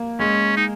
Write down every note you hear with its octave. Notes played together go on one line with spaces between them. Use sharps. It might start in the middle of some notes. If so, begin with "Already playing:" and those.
Already playing: A#3
G#3 C#4
D#4